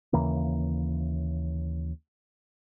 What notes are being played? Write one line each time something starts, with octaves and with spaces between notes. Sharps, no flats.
D#2 C#3 E3 A#3